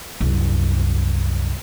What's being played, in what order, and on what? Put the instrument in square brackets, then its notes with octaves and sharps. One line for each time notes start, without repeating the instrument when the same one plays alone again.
[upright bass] C2 F#2